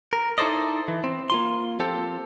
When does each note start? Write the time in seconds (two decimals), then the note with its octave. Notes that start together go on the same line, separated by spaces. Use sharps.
0.13 A#4
0.38 D#4 E4 A4 C5 D5 D#5
0.88 E3
1.04 C4
1.30 A#3 F4 C6
1.80 F3 C4 G4 A4